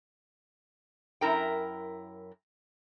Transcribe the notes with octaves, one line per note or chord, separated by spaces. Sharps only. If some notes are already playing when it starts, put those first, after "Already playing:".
F#2 E4 A#4 G5